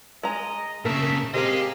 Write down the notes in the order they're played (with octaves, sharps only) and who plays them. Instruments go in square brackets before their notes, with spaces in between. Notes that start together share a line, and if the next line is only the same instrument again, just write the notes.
[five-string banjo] G#3 A#5 [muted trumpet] D#5
[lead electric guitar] A#2 C#3 [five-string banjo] A3 A#4 [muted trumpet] E5
[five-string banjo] C4 A#4 [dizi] G4 [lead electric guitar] G#4 D#5 [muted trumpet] F5